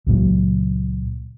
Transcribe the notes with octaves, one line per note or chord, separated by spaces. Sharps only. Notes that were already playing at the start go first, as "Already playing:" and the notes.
C#2 A#2 F#3